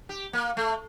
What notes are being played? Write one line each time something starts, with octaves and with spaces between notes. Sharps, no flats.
G4
A#3
A3